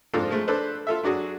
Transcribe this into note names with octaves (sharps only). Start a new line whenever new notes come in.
G#2 F3 C4 D4 F4 A4
F3 G#3 A3
D4 A4 B4 C5
F4 A4 E5
F#3 D4 F#4 G#4